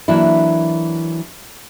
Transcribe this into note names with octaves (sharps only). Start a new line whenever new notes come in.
E3 F#3 A#3 D4 E4